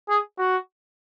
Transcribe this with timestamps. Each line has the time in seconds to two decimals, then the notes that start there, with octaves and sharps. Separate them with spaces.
0.09 G#4
0.38 F#4